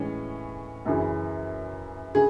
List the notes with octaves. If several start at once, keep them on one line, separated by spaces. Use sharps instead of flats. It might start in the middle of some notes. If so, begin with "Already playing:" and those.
Already playing: A2 E3 G#3 C#4
F#2 C#3 E3
C#3 G#4